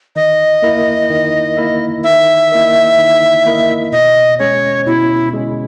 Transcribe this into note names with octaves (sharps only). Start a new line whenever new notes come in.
D#3 D#5
A#3 E4 A#4 E5
D#3
A#3 E4 A#4 E5
D#3 E5
A#3 E4 A#4 D#5
D#3
A#3 E4 A#4 D#5
B2 D#5
G#3 C#4 C#5
B2 E4
G#3 C#4